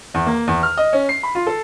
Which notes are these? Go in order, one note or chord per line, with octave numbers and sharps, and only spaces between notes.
E2
A#3
E2
F6
D#5
C#4
C7
B5
F4
A4